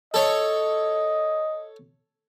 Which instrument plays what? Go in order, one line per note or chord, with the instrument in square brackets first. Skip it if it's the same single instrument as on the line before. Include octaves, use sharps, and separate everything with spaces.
[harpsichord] A4 C#5 [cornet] D#5